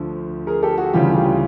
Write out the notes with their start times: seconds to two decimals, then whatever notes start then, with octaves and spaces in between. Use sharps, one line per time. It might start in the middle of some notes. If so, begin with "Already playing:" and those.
Already playing: D2 D3 F3
0.47 G#4 A#4
0.63 G4 A4
0.78 F#4 G#4
0.93 D2 C#3 E3 G3 F4 G4
1.17 F4 G4